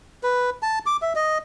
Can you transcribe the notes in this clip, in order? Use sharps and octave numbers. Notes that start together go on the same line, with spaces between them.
B4
A5
D6
E5
D#5